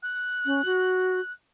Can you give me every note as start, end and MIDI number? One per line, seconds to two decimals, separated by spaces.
0.02 1.31 90
0.46 0.65 61
0.65 1.20 66